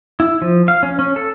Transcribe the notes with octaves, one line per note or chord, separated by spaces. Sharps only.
E4
F3
F5
C#4
C#4
A4